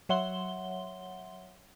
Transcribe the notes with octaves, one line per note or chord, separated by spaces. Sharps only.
F#3 C#5 E5 F#5 C6 G7